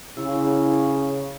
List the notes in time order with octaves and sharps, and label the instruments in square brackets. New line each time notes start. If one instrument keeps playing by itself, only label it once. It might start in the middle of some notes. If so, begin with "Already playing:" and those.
[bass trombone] C#3 [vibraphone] E4